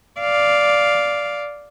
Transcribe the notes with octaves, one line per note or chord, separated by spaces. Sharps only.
D5 F5